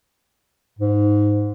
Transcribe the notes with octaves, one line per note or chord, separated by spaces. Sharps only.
G#2